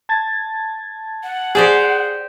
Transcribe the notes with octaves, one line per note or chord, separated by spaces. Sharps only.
A5 G#6 A6
F#5
G4 G#4 C5 D5